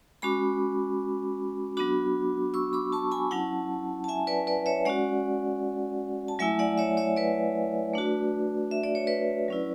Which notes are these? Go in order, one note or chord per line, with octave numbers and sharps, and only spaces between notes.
G#3 C#4 F#4 B5 D6
F#3 B3 D4 F#4 B5 D6
C#6 E6
B5 D6
A5 C#6
G#5 B5
F#3 C#4 E4 F#5 A5
A5
E5 G#5
B4 D5
B4 D5
C#5 E5
G#3 C#4 F#4 D5 F#5
A5
F#3 A3 E4 E5 G#5
D5 F#5
C#5 E5
C#5 E5
B4 D5
A3 D4 F#4
E5
D5
C#5
B4 D5
F#3 C#4 E4